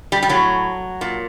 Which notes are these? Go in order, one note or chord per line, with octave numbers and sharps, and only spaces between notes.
G3
G3
A2 F#3
A#2